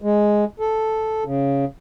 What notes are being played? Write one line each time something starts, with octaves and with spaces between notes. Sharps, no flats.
G#3
A4
C#3